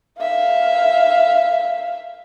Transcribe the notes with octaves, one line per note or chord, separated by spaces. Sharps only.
E5 F5